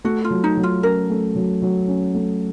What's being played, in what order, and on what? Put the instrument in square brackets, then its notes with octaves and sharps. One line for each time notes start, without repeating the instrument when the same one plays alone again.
[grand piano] A3 [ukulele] F#4
[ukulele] F4
[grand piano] F#3
[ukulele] D#4
[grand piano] F#3
[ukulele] F4
[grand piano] C#4 [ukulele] A#4
[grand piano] A3
F#3
F#3
C#4
A3